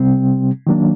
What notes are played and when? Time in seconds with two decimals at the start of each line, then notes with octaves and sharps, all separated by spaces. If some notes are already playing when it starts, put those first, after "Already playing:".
Already playing: C3 G3 C4
0.67 D#3 F#3 A#3 D4